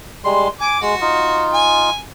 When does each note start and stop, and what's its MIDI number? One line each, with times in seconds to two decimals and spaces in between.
0.25 0.48 55
0.25 0.48 56
0.25 0.48 84
0.61 0.77 80
0.61 0.78 86
0.82 0.95 56
0.82 1.43 66
1.01 1.90 63
1.01 1.90 65
1.54 2.00 80